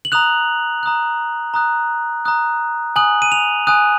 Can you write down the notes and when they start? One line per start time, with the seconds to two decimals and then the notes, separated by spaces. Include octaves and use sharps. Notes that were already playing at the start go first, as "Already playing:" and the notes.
0.05 F#7
0.12 A#5 D#6 F#6 F7
0.83 A#5 D#6 F#6
1.54 A#5 D#6 F#6
2.25 A#5 D#6 F#6
2.96 G#5 D#6 F#6 F#7
3.22 D#7
3.32 F7
3.67 G#5 D#6 F#6